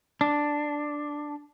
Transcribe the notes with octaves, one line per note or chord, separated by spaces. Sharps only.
D4